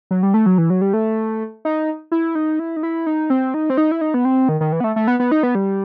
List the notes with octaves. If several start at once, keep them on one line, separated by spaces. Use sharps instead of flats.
F#3
G3
A3
F#3
E3
F#3
G3
A3
D#4
E4
D#4
E4
D#4
E4
D#4
C4
D#4
C4
D#4
E4
D#4
B3
C4
D#3
D#3
E3
B3
A3
A3
B3
B3
D#4
B3
G3